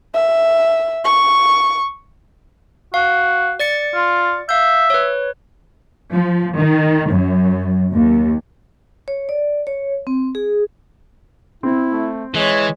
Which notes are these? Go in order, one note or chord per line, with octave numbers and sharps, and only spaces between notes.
E5
C#6
F#4 F5
D5 A6 C#7
F4
E5 F5 G6
B4 C#5
F3
D#3
F#2
D#2
C#5
D5
C#5
C4
G#4
C4 E4
A3
E3 G#3 C#5